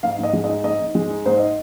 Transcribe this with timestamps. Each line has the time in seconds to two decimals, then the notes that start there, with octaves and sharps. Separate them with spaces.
0.03 G#2 F5
0.19 G#2 D#5
0.33 G#3
0.44 D#5
0.49 D#4
0.64 G#2 D#5
0.80 G#2
0.95 G#3
1.10 D#4
1.25 G#2 C5
1.38 D#5